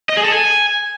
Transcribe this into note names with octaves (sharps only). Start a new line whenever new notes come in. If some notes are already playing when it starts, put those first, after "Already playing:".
D#5
G#4
A4
G#5